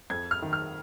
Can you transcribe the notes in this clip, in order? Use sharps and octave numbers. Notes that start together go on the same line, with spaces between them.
F2 G#6
F6
D#3
F6